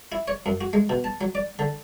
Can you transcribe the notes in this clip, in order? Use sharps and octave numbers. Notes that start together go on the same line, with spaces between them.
E4
C#5
F#2
F#4
G#3
B2
A5
F#3
D5
D3